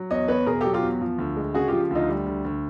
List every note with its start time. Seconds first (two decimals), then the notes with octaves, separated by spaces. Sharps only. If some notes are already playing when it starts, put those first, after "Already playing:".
Already playing: F#3
0.11 E2 C#5 D#5
0.28 E2 B4 C#5
0.46 B2 G#4 A#4
0.61 G4 A4
0.65 F#3
0.74 F4 G4
0.83 E2
1.01 F3
1.18 D2
1.36 G#3
1.55 C#3 F#4 G#4
1.68 F3 F4 G4
1.91 D2 D#4 F4
2.09 G3
2.27 D2
2.45 D2